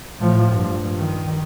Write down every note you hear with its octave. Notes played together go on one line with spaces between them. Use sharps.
A2 F3
G2
D#3